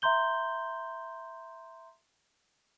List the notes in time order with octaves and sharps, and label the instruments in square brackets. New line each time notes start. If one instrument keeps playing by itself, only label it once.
[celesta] E5 A#5 C6 G6 G7